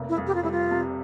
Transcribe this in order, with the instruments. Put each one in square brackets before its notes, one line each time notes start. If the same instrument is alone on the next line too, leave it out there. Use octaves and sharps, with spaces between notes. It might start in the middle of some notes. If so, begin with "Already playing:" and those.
Already playing: [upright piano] F1 A#3
[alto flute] E4
[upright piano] F2
[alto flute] G4
F4
[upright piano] G3 [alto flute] E4
[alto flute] F4
[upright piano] C3